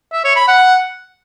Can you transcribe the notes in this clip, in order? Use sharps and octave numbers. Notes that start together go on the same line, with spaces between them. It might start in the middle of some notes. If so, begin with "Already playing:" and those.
E5
C#5
B5
F#5